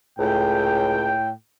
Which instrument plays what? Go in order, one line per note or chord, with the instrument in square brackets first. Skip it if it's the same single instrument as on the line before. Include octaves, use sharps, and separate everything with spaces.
[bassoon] C#2 [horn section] A2 G5